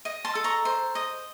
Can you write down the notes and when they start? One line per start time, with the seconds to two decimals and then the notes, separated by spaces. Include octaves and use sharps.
0.05 D#5
0.25 A5 C6
0.35 A4
0.44 A#5 C#6
0.65 C5
0.95 D#5